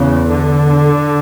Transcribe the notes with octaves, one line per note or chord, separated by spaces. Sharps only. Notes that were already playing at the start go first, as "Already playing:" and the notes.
Already playing: E2 C#3
D3